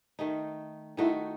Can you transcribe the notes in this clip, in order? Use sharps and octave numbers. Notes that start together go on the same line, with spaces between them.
D#3 A3 D#4
D#3 A3 D#4 E4 F#4